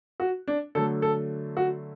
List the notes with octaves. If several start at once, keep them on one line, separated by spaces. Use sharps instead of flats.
F#4
D4
D3 F#3 A3 A4
A4
F#4